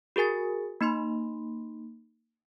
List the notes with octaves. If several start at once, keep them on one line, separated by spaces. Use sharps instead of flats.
F#4 G#4 A#4 G#5 A6
A#3 D#4 B5 C6